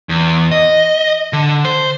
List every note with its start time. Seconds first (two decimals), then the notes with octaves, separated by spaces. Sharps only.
0.09 E2
0.51 D#5
1.33 D3
1.65 C5